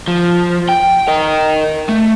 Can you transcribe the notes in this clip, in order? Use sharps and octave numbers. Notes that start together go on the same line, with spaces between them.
F3
G5
A#4 D#5
A3